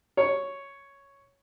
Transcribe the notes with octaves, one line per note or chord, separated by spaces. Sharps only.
C#5